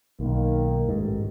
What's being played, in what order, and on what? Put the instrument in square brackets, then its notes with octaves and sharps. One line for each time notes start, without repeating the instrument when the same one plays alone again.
[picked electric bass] B1 [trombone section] D#3 A#3
[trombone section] A1 [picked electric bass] G#2